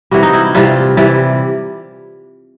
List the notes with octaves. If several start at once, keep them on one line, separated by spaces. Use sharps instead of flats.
C3 E3 G3 F#4
D#4
E4
C3 E3 G3 F4
C3 E3 G3